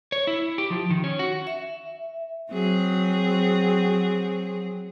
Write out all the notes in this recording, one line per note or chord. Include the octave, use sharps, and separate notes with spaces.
C#5
E4
G4
F3
D#3
C#4
F#4
E5
F#3 C4 G#4